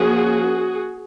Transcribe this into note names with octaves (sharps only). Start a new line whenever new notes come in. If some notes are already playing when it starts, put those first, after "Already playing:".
Already playing: F3 A#3 C#4 F#4 G#4